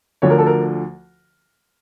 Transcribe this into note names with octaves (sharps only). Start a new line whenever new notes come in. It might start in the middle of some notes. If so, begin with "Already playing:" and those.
D2 D3 F3 C#5
A#4
A4
A#4